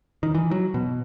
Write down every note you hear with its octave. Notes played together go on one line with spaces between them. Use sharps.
D#3
E3
F#3
B2